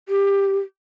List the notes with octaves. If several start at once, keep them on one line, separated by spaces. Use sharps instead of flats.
G4